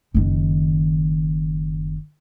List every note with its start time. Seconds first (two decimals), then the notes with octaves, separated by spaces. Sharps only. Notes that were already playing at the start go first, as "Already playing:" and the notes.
0.14 F#1 D#3